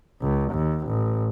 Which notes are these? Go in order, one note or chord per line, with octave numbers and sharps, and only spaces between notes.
C#2
D#2
A1